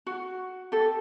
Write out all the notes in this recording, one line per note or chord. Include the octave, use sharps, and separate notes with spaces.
F#4
G4 A4